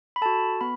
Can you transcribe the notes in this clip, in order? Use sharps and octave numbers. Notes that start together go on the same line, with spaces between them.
B5
F#4 A4 A5
B3 B5